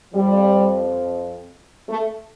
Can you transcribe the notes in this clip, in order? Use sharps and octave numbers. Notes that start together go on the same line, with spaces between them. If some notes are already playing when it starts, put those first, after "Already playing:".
F2 F3 G3
A3